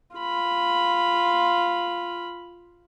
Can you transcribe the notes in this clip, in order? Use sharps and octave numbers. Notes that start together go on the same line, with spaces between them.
F4 B5